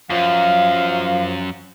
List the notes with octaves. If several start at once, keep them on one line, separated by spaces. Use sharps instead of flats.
F#2 F3 F5